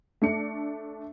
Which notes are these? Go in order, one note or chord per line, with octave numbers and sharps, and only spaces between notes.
A3 D4 C#7